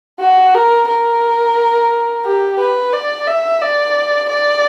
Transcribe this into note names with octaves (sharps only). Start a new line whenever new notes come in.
F#4
A#4
A#4
G4
B4
D5
E5
D5
D5